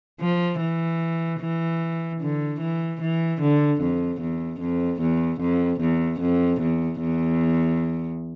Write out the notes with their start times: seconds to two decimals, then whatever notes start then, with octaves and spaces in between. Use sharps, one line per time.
0.21 F3
0.61 E3
1.40 E3
2.21 D3
2.60 E3
3.01 E3
3.41 D3
3.81 F2
4.21 E2
4.61 F2
5.01 E2
5.41 F2
5.80 E2
6.21 F2
6.61 E2
7.01 E2